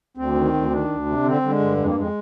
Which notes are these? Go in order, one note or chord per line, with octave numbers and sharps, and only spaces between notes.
D2 C4
D#3
D2
D#3 D4
D2
C3
D3 C4
D3 G3
G#3
G2
F2 G#3
A#3
F2 G#3